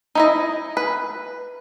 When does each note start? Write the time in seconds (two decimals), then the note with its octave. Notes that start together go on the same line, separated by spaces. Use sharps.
0.15 D#4 E4 D#5
0.77 B4